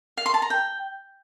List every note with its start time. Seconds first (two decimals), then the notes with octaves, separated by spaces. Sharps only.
0.17 F5
0.26 C6
0.34 A5
0.42 A#5
0.50 G5